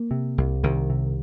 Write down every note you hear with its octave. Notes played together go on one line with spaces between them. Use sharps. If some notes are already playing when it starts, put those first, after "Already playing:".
Already playing: A#3
C3
C2
C2 D#3
C3